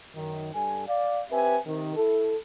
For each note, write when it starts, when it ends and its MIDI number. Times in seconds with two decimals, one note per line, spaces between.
0.15 0.51 42
0.15 0.51 51
0.53 0.84 43
0.53 0.84 69
0.53 0.84 80
0.88 1.21 74
0.88 1.21 77
1.31 1.57 60
1.31 1.57 67
1.31 1.57 71
1.31 1.57 76
1.31 1.57 80
1.65 1.93 48
1.65 1.93 51
1.96 2.34 64
1.96 2.34 69